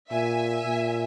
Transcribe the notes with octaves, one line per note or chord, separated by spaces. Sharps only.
A#2 E5 G#5
A#2